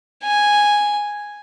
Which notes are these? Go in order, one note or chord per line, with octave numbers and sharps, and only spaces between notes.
G#5